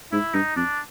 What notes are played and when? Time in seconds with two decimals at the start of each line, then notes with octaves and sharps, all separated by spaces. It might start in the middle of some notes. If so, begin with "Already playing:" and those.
0.12 G#2 E4
0.34 G2 D#4
0.56 F2 D4